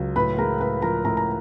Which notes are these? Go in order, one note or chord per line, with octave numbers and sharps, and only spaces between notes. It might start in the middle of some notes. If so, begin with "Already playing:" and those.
Already playing: C#2 F#3
A2 B4 B5
G#3 A#4 A#5
A2 B4 B5
F3 A#4 A#5
A2 A#4 A#5
A#5